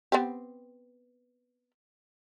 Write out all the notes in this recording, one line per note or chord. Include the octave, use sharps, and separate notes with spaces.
B3 C4 G4